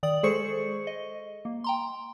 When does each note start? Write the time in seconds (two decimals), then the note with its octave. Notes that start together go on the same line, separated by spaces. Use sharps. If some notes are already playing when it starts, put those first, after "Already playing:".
0.03 D#3 D5 D#6 F#7
0.23 G#3 G#4 A4 C5 C#6 C#7
0.87 D#5
1.45 A#3
1.64 G5 A#5 C6